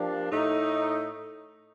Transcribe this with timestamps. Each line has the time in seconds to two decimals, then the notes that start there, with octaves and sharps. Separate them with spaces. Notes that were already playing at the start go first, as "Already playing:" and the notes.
Already playing: F3 A#3 D4 G4
0.31 A2 A3 D#4